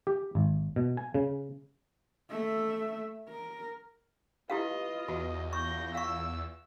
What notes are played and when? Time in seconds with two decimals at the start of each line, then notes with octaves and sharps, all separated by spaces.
0.07 G4
0.35 G#1
0.76 B2
0.97 G#5
1.14 C#3
2.30 A3 E5
3.29 A#4
4.50 E4 F4 G4 B4 D#5 F5
5.08 E2 F#4
5.53 F4 C#6 G6 A#6
5.95 F5 C#6 E6